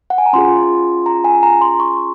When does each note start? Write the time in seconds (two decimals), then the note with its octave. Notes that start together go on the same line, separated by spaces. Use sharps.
0.10 F#5
0.18 G#5
0.26 A#5
0.33 C#4 F4 G#4 C6
1.06 A#5
1.24 G#5
1.43 A#5
1.61 C6
1.80 C#6